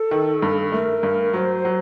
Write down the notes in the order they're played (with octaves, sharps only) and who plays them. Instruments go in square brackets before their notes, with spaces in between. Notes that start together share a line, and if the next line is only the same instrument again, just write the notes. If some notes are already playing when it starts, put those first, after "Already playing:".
Already playing: [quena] A4
[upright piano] D#3
G2
[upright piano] A3 [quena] A#4
[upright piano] G2
[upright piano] F#3 [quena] C5
[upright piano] F#3